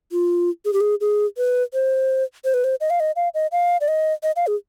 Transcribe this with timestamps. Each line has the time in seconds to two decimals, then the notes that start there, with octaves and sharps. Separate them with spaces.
0.12 F4
0.65 G#4
0.73 G4
0.80 G#4
1.01 G#4
1.38 B4
1.73 C5
2.45 C5
2.54 B4
2.64 C5
2.81 D#5
2.90 F5
3.00 D#5
3.16 F5
3.34 D#5
3.52 F5
3.81 D5
3.88 D#5
4.23 D#5
4.36 F5
4.47 G#4